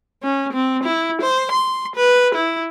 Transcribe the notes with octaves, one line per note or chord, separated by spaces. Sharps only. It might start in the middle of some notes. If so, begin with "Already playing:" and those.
C#4
C4
E4
C5
C6
B4
E4